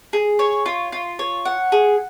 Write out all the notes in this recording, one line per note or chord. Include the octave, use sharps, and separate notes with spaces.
G#4
C#5
F4
F4
C#5
F#5
G#4